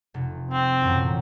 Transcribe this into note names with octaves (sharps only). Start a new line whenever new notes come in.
F1
C4 F5
A1 F#2 A#2